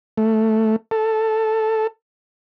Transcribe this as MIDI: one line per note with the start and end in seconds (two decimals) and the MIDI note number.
0.18 0.76 57
0.91 1.87 69